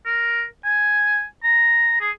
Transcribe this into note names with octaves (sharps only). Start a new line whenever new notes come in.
A#4
G#5
A#5
G#4